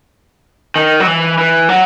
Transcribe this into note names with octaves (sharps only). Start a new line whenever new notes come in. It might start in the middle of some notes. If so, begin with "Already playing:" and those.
D#3
F#3
E3
E3
F#3